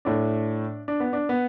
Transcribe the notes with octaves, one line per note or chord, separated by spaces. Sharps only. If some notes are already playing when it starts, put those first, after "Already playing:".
A2 A3 D4
D4
B3
D4
B3